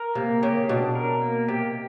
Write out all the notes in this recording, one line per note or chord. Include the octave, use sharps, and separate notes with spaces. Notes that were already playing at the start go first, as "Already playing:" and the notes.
Already playing: A#4
C3 A#3
C#3 G4
B2 D4
A#4
A#3
C3 G4